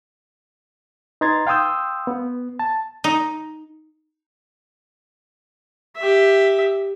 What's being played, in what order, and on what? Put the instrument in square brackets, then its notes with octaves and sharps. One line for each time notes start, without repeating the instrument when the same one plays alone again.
[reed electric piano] D#4 B4 A#5 C6 G#6 A6
F5 G5 C6 D#6 E6 G6
B3
A5
[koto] D#4
[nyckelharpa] G4 E5